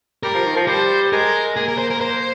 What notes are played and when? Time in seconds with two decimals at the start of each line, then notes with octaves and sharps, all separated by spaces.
0.23 G3 A#4
0.35 F3
0.46 D#3
0.57 F3
0.68 G3 C5
1.12 G#3 A#4
1.57 A#3 G#4
1.68 A#4
1.78 C5
1.90 A#4
2.01 C5